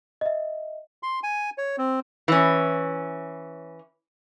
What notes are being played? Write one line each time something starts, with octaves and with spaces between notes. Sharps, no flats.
D#5 E5
C6
G#5
C#5
C4
E3 C#4